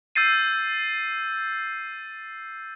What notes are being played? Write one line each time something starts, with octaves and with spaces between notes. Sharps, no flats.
E6 G6 A6 C7 D#7